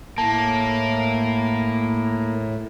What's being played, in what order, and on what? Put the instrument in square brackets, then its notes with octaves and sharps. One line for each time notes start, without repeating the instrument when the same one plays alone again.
[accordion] A2 [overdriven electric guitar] A#3 [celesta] A5